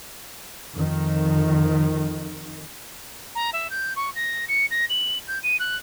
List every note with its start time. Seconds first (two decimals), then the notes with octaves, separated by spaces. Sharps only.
0.76 F2 D#3
3.35 A#5
3.53 E5
3.70 G6
3.96 C#6
4.15 A#6
4.48 C#7
4.70 A#6
4.89 F#7
5.27 G6
5.43 D#7
5.59 F#6